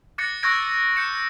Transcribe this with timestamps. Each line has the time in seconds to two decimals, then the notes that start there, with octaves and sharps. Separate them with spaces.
0.18 D6 F#6 A6 A#6 C#7
0.43 C#6 E6 F#6 G#6 A#6 D7
0.96 G6 C#7 E7